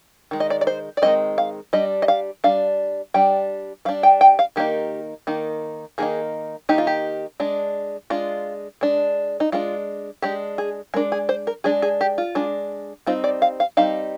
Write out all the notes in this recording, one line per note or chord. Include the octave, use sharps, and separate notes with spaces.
D#3 G#3
D#5
D5
D5
C5
D5
D#3 G#3 C4 D#5
F5
G3 D4 D#5
D#5
F5
G3 D4 F5
G3 D4 G5
G3 D4 F5
G5
G5
F5
D#3 A#3 D#4 G4
D#3 A#3 D#4
D#3 A#3 D#4 G#4
D#3 A#3 D#4 G4
F4
G4
G#3 D4
G#3 D4 F4
G#3 D4
D#4
G#3 D4 F4
G#3 D4 G4
G#4
G#3 D4 A#4
G#4
C5
A#4
G#3 D4 G#4
G#4
G4
F4
G#3 D4
G3 C4 D#4 F4
D5
F5
F5
G3 C4 D#4 F5